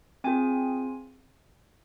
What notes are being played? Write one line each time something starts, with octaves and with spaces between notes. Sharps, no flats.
C4 F4 G#4 G#5